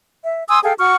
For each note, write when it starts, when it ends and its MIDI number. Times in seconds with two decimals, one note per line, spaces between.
0.23 0.43 76
0.48 0.59 80
0.48 0.59 84
0.48 0.59 87
0.48 0.59 88
0.63 0.73 68
0.63 0.73 69
0.63 0.73 77
0.63 0.73 79
0.78 0.96 66
0.78 0.96 78
0.78 0.96 85
0.78 0.96 89